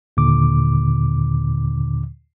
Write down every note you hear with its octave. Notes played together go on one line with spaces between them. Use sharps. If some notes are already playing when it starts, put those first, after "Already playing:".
D#2 A#2 D3 D6